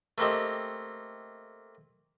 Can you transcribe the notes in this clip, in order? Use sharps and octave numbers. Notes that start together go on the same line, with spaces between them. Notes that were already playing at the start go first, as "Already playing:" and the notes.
A3 A#3 C4 G4 D#5